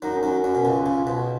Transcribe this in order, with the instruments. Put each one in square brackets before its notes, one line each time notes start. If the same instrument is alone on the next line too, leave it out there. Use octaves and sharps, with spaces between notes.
[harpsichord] F#2 F#3 [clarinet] D#4
[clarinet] C#4
[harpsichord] F#2 F#3
[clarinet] C#4
[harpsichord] F#2 F#3
B2
C#2 C#3
C#2 C#3
B1 B2